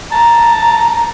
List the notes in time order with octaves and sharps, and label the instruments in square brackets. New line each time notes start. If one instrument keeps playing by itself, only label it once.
[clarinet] A5 [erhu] A#5